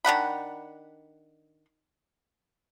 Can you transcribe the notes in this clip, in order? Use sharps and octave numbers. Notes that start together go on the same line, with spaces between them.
D#3 D4 F#5 B5